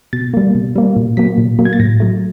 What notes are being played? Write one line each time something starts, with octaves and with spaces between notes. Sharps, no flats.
B2 A6
G3 A#3
B2
G3 A#3
A#2
F#3 A#3 B6
A#2
F#3 A#3
G#6
A6
A2 A#6
F#3 A3